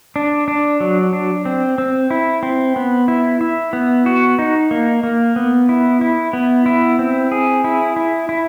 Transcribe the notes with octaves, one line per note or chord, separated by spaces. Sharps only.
D4
D4
F#3
D4
C4
C4
E4
C4
B3
E4
E4
B3
F#4
D#4
A#3
A#3
B3
E4
E4
B3
E4
C4
G#4
E4
E4
E4